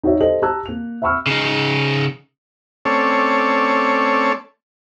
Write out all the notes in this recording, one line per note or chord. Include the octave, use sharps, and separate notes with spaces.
D#4 F#4 C#5 E5
G4 A4 C5 D#5 F#7
G4 A5 A#5 E6 F#6
A#3 F7
E5 F#5 B5 C#6 E6 F6
C#3 D#4
A3 C4 C#4 A4 C#5 D5